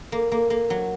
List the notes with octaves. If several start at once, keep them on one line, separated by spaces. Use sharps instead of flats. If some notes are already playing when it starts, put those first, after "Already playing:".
A#3
A#3
A#3
F#3